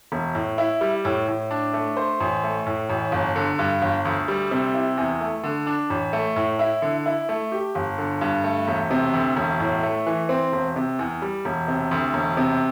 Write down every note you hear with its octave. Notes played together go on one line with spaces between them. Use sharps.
E1
A2
E4
G3
A2
A2
D4
A3
C5
A1
A3
A2
A1
G1
D3
G2
G1
D2
G3
C3
E4
E2
A3
D3
D4
A1
A3
A2
E4
D3
E4
A3
G4
G1
D3
G2
A3
E1
C3
D2
E1
A2
A3
E3
C4
E1
C3
E2
G3
E1
C3
D2
E1
C3